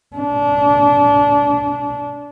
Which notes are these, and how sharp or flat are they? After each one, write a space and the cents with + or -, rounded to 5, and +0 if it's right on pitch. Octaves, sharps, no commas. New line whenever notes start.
D4 -25